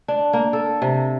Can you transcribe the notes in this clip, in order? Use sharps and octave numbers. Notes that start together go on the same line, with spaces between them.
D4
A#3
A4
C3